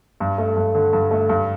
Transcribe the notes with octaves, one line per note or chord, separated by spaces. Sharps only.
G2
A3
G2
D3
G2
A3
G2